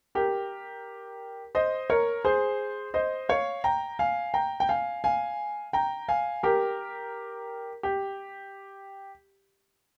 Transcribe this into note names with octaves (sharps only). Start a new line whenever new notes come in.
G4 A#4
C5 D#5
A#4 C#5
G#4 C5
C5 D#5
C#5 F5
G5 A#5
F5 G#5
G5 A#5
G5
F5 G#5
F5 G#5
G5 A#5
F5 G#5
G4 A#4
G4